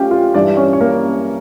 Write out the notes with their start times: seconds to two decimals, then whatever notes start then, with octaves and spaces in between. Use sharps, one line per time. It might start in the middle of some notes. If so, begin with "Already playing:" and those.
Already playing: A3 C#4 F4 G4 F5 G5
0.11 F4 F5
0.34 G2 E3 G3 D4 D5
0.57 C#4 C#5
0.73 C#5
0.81 A#3 A#4